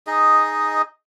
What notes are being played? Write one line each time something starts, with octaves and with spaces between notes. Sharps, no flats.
D#4 G#4 D#5